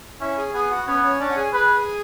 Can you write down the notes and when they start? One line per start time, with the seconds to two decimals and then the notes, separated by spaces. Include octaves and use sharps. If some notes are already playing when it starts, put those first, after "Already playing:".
0.21 C#4 E4 E5
0.38 G#4 G#5
0.54 B3 G#4 G#5
0.70 F#4 F#5
0.87 B3 C#4 C#5
1.04 C#4 C#5
1.20 C#4 D4 D5
1.30 F#5
1.36 G#4 G#5
1.53 G#4 B4 G#5